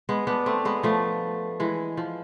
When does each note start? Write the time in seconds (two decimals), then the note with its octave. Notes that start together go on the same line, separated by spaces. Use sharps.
0.09 G#3 B3
0.27 B3 D4
0.46 A3 C4
0.65 G#3 B3
0.83 F3 A3
1.60 E3 G#3
1.97 F3